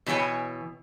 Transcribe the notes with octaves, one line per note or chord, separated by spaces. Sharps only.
B2 E3 C#5 G5 G#5